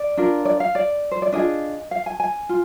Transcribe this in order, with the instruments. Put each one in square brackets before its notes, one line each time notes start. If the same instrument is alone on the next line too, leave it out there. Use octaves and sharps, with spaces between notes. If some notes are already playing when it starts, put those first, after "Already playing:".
Already playing: [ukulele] D5
D4 F4 A#4
D5
F5
D5
C5
D5
D4 F4 G#4 D#5
F5
G#5
G#5
F4